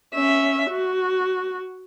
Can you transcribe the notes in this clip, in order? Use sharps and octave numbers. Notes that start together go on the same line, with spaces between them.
C#4 E5
F#4